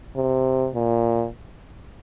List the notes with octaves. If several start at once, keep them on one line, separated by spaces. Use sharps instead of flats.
C3
A#2